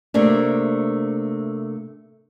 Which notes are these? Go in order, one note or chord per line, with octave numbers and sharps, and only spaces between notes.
C3 A3 A#3 D4